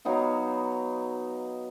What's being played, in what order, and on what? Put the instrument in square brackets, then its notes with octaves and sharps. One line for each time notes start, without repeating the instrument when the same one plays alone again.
[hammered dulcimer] F#3 B3 D#4 F5